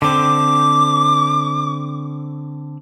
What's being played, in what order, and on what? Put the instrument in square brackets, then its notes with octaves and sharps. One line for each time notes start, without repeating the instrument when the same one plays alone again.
[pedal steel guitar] D3 C4 [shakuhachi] D6